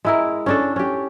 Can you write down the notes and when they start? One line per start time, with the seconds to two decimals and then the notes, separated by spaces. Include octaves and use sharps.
0.05 G#3 E4 A#4
0.46 C#4 D4 A4
0.76 C#4 G4